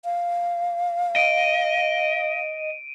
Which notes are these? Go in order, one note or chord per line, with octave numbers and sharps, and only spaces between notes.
F5
D#5 D7 D#7